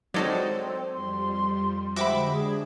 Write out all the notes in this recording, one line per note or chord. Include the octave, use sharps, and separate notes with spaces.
F#3 G#3 C4 D#4 F#4 A4 D5
F2 G3 C6
D3 G#3 F#4 G4 C5 E5 B5 D6
D4 G#4